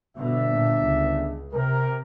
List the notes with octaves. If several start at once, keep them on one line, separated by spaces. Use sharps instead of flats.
G1 B2 D4 E5
A#2
C#2
C3 A#4